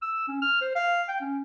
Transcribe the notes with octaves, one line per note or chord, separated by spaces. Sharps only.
E6
C#4
F6
C5
F5
G5
C#4